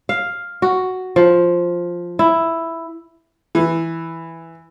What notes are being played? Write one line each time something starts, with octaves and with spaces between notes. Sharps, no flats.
F5
F#4
F3
E4
E3